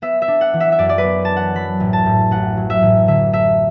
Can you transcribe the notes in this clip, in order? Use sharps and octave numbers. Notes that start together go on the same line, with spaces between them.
B3 E5
E5
D4
F#5
E3
E5
E5
F#2 D5
D5
B4
B3
A5
D4
F#5
F#3 B5
A1
A5
A2
A1 F#5
F#3
E5
A1
D3 E5
A3 E5